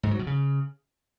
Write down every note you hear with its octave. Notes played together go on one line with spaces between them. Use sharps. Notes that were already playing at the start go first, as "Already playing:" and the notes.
G#2
F#3
B2
C#3